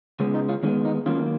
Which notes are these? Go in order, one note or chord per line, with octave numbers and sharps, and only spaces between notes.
C#3 G#3 B3 C#4
D#4
C#4 F4
D#3 G#3 B3 C#4
D#4
D#3 F#3 A#3 C#4 F4